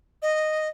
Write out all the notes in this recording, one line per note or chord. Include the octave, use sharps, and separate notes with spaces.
D#5